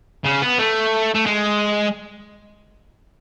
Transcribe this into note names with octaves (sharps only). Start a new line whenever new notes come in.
C#3
B3
A3
A3
G#3